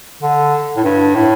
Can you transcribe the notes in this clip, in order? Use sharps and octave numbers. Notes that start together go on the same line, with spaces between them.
D3
A2
G2
A2